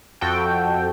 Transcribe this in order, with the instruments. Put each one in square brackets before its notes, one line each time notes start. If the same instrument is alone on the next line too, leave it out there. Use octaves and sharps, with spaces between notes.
[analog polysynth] F2 F#4 A4 G5